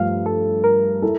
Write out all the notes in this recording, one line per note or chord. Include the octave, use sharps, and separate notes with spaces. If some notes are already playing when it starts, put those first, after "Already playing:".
Already playing: G2 F3 A3 F5
A4
A#4
E4 A4